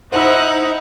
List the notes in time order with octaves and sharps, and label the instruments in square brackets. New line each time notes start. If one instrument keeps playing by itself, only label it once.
[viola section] D#4 [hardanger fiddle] E4 F#5 [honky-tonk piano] C5 E6